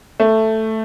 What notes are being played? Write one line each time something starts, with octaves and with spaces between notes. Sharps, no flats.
A3